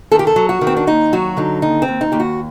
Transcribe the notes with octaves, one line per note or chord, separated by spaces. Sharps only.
D#3 A4
G4
A4
F#3
F#4
D#3
C4
D4
D#2 D#4
F#3 F#4
D3 D#4
D#2 D#4
C4
D#2
D#4
D#2 G4
F#4